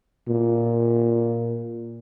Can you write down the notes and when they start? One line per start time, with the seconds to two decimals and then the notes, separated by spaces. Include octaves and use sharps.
0.28 A#2